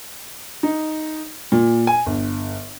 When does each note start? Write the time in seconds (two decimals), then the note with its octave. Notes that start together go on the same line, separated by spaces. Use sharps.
0.63 D#4
1.52 A#2
1.87 G#5
2.06 G1